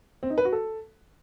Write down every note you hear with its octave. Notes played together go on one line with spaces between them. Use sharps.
C4
D#4
B4
F#4
A4